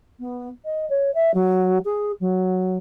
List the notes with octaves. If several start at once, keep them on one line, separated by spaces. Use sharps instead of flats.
B3
D#5
C#5
E5
F#3
G#4
F#3